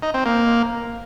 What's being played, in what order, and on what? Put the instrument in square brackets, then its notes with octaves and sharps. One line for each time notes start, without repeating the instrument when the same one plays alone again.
[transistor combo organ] D#4
C4
A#3